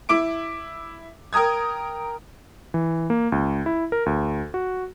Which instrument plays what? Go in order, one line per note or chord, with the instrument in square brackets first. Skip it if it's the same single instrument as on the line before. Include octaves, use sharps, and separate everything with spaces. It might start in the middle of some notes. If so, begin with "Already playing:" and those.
[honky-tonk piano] E4 D6 D7
A#4 G5 A#5 D#6 G#6
[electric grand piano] E3
A#3
C#2
E4
A#4
D2
F#4